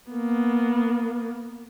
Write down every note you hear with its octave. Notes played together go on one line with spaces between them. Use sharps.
A#3 B3